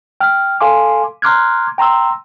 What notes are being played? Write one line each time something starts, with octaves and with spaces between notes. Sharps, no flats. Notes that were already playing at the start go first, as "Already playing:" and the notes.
G5 F6
A4 F5 G#5 C6 D6
A#5 C6 D6 F6 F#6 G#6
G5 A#5 C6 E6